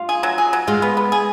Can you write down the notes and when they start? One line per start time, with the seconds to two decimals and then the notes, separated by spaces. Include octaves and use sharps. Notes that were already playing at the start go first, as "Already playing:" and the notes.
Already playing: F4
0.09 G#4
0.23 F#3
0.38 G#4
0.53 F#3
0.67 G#3 F4
0.82 B3
0.97 B3
1.12 G#4